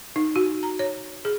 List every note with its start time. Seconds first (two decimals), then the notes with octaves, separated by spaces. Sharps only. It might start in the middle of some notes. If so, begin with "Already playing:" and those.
0.16 D#4
0.36 F#4
0.63 A#5
0.79 C#5
1.25 G#4